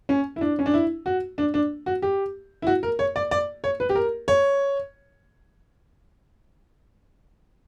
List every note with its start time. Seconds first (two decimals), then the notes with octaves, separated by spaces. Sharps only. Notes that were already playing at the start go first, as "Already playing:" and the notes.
0.09 C#4
0.36 E4
0.41 D4
0.59 C#4
0.66 D4
0.74 E4
1.06 F#4
1.38 D4
1.54 D4
1.86 F#4
2.02 G4
2.62 E4
2.67 F#4
2.83 A#4
2.99 C#5
3.16 D5
3.31 D5
3.64 C#5
3.80 B4
3.89 G4
3.95 A#4
4.28 C#5